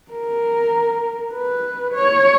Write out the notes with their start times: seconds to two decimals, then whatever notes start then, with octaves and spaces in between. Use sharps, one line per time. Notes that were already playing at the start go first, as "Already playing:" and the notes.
0.11 A#4
1.33 B4
1.94 C#5